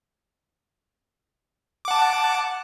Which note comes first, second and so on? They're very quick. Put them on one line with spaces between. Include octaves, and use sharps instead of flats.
D6 F#5 A5